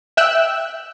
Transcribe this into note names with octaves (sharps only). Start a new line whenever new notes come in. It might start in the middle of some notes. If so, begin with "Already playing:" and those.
E5 G5 E6 F#6